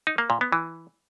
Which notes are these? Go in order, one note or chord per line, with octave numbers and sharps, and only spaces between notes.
D#4
A#3
A#2
B3
E3